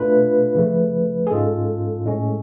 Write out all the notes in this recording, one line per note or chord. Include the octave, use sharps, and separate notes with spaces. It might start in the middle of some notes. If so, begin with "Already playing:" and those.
Already playing: B2 A3 D4 F4 B4
C#3 F3 A3
G#4
G#2 G#3 C#4 F4 A4
A2 G#3 C#4